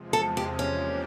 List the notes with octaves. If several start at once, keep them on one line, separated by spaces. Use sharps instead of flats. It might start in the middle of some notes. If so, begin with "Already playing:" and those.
Already playing: E2 C3 F3 G#3
A4
G4
F3 A#3 C#4 D4 G4